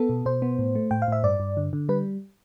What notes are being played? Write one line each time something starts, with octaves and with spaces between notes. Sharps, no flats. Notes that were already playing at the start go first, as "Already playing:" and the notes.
Already playing: B3 A4
B2
B2 C5
B3
A2
A3
A2 G5
F5
A2 E5
G2 D5
G2
D3
D3
G3 B4